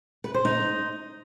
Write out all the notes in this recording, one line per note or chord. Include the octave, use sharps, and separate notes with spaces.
B4
C5
D#4